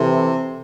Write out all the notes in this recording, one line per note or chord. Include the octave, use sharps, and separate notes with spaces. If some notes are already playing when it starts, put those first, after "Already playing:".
Already playing: C3 E3 C4 E4 A4